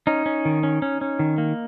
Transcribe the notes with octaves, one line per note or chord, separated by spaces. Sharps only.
C#4 D#4
C#4
D#3
C#4
C#4
C#4
D#3
A#3